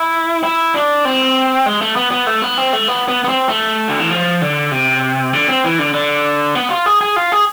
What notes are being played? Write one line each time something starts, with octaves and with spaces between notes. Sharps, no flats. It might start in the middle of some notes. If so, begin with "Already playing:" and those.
Already playing: E4
E4
D4
C4
G#3
A3
B3
B3
A3
B3
C4
A3
B3
B3
B3
C4
A3
D3
E3
F3
D3
C3
D3
C4
E3
D3
D3
B3
F4
G#4
G#4
F4
G#4